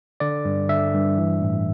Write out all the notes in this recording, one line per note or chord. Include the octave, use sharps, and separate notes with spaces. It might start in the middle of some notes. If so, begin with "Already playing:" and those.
D3 D5
G2
D3 E5
G2
E3
A2